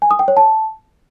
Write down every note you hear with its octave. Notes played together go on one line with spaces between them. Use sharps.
G#5
D#6
G5
C#5
A5